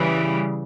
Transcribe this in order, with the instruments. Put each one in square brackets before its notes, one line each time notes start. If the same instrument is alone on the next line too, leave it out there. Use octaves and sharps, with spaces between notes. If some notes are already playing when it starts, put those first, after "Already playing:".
Already playing: [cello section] C#3 E3 G3